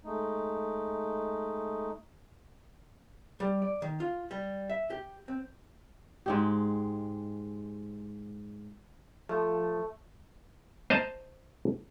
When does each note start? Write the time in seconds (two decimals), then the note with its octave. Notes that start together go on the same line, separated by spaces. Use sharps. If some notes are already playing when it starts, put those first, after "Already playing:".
0.05 G#3 A3 D#4
3.40 G3
3.62 D5
3.82 D#3
4.00 F4
4.31 G3
4.70 E5
4.90 G4
5.28 C4
6.26 G#2 G#3 G4
9.29 F3 A3
10.90 C5 D#5 A5 A#5